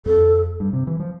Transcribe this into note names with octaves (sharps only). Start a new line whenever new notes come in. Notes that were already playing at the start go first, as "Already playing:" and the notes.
F2 A4
G2
C3
E3
F3